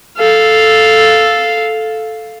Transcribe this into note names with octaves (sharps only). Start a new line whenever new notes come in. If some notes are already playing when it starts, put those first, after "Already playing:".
A4 F5